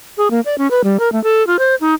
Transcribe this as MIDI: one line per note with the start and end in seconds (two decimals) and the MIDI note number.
0.18 0.31 68
0.31 0.40 58
0.46 0.55 74
0.58 0.70 61
0.71 0.81 71
0.84 0.97 55
1.00 1.11 70
1.12 1.22 57
1.24 1.45 69
1.47 1.57 65
1.59 1.75 72
1.81 1.94 63